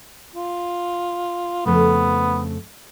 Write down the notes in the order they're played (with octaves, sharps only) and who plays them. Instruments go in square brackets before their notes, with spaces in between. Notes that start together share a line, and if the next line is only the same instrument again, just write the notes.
[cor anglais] F4
[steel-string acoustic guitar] F2 C#3 A3 [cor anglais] B3